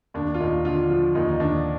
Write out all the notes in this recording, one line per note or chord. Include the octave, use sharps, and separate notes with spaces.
D#2 D4
F4
D#2 D#4
D3 F4
F3 F4
D#2 D#4
D#4
D#2 D4